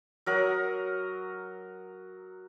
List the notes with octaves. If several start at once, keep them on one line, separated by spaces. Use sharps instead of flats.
F#3 A#4 F#5 D#6